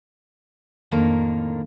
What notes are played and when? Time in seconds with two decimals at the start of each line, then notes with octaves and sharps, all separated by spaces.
0.91 F2 A2 D3 D#3 A#3 D4